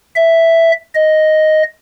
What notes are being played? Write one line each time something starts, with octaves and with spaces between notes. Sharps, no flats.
E5
D#5